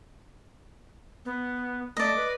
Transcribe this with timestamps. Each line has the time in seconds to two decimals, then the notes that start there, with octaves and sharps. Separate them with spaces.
1.25 B3
1.97 A3 D5 D#5
2.16 B4